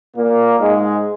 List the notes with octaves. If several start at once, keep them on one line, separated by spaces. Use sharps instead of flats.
A#2 A#3
G#2 G#3